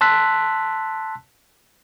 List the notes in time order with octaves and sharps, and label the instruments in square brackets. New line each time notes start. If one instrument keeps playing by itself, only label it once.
[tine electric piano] A5 C6 E6 F#6 B6